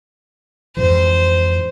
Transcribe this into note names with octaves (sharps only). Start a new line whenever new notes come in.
F2 G#2 E3 C5